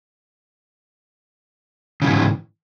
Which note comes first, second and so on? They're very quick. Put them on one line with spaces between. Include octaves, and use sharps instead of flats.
C#3 E3 G#2